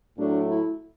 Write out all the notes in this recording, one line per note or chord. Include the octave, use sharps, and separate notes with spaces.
A2 F#3 A3 D4
E4